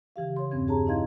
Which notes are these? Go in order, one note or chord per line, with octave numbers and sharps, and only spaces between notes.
C#3 E3 G4 F5
C#5 C6
E2 G2 C4 C#4 G#6
D4 G4 G#4 C#5 A5 A#5
D#4 E4 D#5 F5 C6 G#6